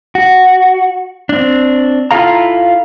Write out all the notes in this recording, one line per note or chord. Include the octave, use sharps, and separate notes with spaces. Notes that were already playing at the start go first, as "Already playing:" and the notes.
F#4
C4 D4
E4 F4 A4 F5 A#5